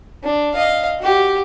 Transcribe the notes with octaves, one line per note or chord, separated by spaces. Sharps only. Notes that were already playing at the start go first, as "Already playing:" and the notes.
D4
D#5 F5
F#4 G4